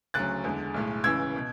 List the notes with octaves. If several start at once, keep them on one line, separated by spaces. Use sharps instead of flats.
D2 C#3 F#3 F#6 A6
E2 D3 G#3
B1 A2 G#3
C#2 C#3 E3 E6 G#6
B2